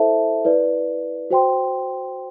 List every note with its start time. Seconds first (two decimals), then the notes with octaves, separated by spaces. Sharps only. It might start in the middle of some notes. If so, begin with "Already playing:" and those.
Already playing: E4 A4 C5 E5 A5
0.45 E4 B4 D5
1.30 F#4 C5 G5 C6